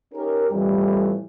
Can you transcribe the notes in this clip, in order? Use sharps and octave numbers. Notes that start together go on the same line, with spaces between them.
C#4 D#4 G4 A#4
F2 A2 E3 G3